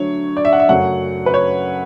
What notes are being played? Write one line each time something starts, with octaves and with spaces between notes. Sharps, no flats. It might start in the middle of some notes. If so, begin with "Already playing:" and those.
Already playing: D3 F#3 A3 C#5
D5
E5
F#5
E5
F#2 C#3 F#3 A3 F#5
B4
C#5